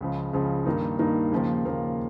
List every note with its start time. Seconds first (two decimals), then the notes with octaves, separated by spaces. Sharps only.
0.01 C#2 C#3 F3
0.33 C#2 C#3 F3
0.66 G2 D#3 A#3 D#4
0.99 G2 D#3 A#3 D#4
1.32 D#2 C#3 F3 A#3
1.65 D#2 C#3 F3 A#3